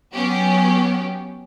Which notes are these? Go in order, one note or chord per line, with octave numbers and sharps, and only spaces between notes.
F#3 B3 C#4 G4